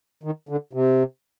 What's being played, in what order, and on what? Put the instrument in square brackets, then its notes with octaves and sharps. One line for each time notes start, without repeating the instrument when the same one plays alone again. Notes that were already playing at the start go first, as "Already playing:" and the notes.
[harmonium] D#3
D3
C3